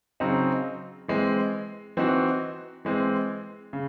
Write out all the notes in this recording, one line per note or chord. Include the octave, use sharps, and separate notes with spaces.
C#3 F#3 C4 D#4
E3 G#3 C4
E3 C4 D#4 F#4
E3 G#3 C4
C#3